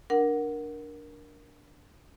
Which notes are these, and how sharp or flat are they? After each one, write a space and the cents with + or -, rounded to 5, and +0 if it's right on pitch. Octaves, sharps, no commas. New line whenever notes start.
D4 +0 A#4 +10 F#5 +0